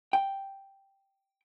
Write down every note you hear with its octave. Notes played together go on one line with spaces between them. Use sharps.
G5